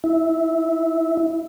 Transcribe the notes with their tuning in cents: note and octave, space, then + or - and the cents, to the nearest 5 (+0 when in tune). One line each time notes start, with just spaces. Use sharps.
E4 -15